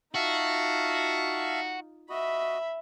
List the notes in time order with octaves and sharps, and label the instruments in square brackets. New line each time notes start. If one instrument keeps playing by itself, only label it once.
[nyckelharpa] D#4 F4 [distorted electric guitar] F#4 [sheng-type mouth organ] E5 F5 A5
[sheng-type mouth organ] F#4 D#5 [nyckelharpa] E5 B5